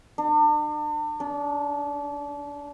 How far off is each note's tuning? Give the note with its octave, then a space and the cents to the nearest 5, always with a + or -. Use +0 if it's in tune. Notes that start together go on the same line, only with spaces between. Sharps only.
D4 +40
D4 -30